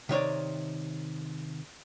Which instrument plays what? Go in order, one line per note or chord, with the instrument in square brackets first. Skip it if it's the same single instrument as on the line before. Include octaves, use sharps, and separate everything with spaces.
[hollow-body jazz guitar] C3 D#3 C#5 D5